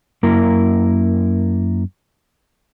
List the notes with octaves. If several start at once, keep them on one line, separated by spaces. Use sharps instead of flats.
F#2 A#3 E4 A#4